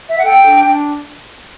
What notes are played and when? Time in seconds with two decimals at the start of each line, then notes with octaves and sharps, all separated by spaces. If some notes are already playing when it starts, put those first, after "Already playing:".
0.08 E5
0.15 F#5
0.23 A4 G5
0.44 D4
0.65 D4